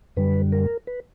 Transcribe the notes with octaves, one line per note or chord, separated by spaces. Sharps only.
F#2 D3 G3 B4
A#4
B4